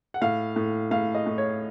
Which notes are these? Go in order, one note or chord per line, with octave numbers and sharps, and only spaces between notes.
F#5
A2 F5
A2
A2 F5
D#5
A2
C#5